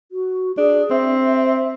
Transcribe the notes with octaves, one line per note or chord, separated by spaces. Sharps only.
F#4
D4 G#4
C4 E5